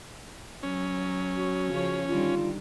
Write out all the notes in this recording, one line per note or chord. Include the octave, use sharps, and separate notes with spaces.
F#3 C#4
F#4
C#3 F3 C#5
D3 D#3 G3 F4